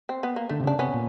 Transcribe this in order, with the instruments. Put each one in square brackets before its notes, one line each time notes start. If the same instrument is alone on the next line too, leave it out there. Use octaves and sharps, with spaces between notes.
[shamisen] C4
B3
A#3
[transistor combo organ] D3 [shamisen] A3
[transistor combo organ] C3
[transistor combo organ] C#3 [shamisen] D4
[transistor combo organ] C3 [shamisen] B3 C#4
[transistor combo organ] A#2